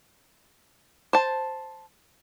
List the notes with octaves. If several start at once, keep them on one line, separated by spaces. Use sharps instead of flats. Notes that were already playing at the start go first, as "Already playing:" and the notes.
C5 A5